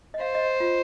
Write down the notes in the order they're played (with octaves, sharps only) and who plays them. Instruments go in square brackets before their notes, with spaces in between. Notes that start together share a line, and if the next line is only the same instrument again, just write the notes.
[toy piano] D#5
[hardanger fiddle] C5 [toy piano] F5
[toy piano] D#5
F4